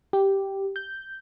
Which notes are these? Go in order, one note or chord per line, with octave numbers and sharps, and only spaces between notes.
G4
G6